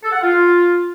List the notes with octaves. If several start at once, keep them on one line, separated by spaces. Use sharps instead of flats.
A4
F#5
F4